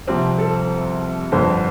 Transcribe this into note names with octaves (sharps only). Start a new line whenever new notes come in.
C2 C3 F3 C4
A4
G1 F2 D3 C5